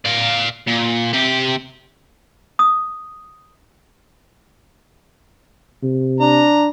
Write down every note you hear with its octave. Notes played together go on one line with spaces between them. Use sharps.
D5 F5
A#2
C3 G4
D#6
C3
D4 A#5